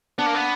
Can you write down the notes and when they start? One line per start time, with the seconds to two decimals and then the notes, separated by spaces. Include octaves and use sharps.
0.18 B3 D4
0.26 A#3
0.35 B3